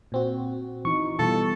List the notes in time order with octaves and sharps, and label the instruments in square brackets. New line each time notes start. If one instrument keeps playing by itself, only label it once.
[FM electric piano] A#2 C4 F#4
[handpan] E3 D#4 [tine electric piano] C#6
[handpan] B2 E3 G3 [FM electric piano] F4 [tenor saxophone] A4